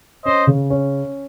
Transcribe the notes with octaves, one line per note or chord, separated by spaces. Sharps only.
C#4 C5 D#5
C#3
C#4